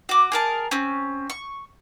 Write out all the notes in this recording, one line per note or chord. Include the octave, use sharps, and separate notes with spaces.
F#4 D6
G#4 A#4 A5
C4 C#4
C#6